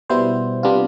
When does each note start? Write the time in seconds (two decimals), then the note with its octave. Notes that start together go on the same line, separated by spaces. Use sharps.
0.10 B2 G3 B3 E4 C5
0.63 C3 G3 B3 D4 F4